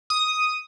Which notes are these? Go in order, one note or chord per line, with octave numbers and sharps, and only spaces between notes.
D#6